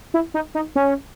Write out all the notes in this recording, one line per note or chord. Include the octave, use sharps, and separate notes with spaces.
E4
D#4
D#4
C#4